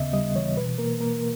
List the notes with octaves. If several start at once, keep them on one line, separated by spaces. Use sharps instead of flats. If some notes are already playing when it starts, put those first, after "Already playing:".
Already playing: D#2 C#3 B3 D#5 E5
G3 D#5
E3 C#5
B2 B4
A#3 A#4
A#3 A#4